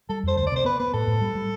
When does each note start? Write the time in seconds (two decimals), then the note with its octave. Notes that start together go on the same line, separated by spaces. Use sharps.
0.09 G3 A4
0.23 F2 C5
0.36 D2 C5
0.47 D5
0.52 C3 C5
0.65 B3 B4
0.79 B3 B4
0.93 A2 A4
1.07 A2
1.21 G3
1.35 G3